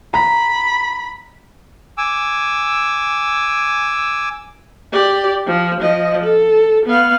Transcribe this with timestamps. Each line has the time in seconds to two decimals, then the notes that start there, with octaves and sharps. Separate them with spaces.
0.14 A#5 B5
1.98 G#5 D6 E6
4.92 G4 D5
5.46 F3
5.81 F3 D#5
6.24 A4
6.86 B3 F5